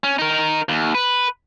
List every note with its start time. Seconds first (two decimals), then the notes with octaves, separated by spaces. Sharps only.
0.04 C#4
0.19 D#4 A#4
0.69 D#2
0.95 B4